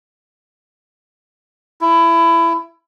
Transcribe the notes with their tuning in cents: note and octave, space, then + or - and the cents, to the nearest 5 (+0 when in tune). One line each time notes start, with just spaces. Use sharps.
E4 +20